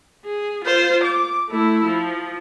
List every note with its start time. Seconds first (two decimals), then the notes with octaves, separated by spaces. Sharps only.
0.25 G#4
0.65 F4 C5
1.04 D6
1.49 A3 E4
1.85 F3